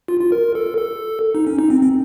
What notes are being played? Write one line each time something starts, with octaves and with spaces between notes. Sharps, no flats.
F4
F4
A#4
A4
A4
D#4
C#4
D#4
C4
C4